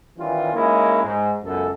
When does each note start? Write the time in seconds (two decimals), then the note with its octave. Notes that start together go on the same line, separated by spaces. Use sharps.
0.18 D#3 E3 G3 C#4 F4
0.54 G#3 A#3 C#4 D#4 E4
1.04 G#2
1.44 C#2 F#2 B2 A4